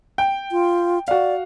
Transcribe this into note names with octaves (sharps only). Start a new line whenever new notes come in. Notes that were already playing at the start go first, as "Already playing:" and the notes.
G5
F4
F#4 D5 F5